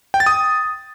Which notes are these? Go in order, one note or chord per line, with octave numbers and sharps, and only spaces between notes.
G5
A6
D#6